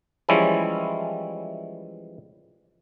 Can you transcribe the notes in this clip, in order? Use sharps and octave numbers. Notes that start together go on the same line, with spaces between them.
E3 F3 G3 G#3 C#4 E4